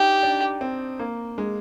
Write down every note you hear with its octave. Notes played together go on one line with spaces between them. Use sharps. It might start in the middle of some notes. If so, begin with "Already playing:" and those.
Already playing: D4 D#4 G4
D4
C4
A#3
G#3